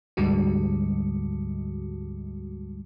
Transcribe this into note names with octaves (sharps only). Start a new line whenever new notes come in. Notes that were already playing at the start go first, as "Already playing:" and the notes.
D2 G#2 D3 G3 G#3 F#4